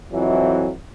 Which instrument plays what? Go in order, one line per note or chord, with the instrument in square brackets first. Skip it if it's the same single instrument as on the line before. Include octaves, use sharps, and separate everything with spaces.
[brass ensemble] F2 E3 F#3